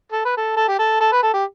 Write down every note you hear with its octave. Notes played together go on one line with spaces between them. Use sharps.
A4
B4
A4
A4
G4
A4
A4
B4
A4
G4